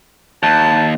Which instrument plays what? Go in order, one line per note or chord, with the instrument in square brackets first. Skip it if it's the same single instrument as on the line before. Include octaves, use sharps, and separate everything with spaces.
[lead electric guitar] D#2 [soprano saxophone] A5